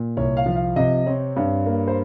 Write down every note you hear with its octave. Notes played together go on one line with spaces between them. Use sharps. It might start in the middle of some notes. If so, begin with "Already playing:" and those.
Already playing: A#2
C2 C#5
F5
F3
F5
C3 D#5
C4 C#5
G2
A#3
C5